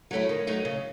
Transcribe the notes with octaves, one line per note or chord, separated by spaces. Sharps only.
F#3 A3 C#4 E4
D#3
F#3 A3 D#4
C#3